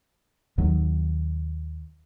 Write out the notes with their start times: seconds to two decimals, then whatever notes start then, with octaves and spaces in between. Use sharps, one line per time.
0.58 D#2 D#3 F#3